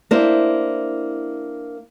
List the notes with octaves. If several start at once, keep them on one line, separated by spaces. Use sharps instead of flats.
A#3 D4 E4 C5